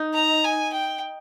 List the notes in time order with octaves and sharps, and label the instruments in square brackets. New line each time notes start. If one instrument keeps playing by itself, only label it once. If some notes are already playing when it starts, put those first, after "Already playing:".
Already playing: [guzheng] D#4
[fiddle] A#5
G#5
G5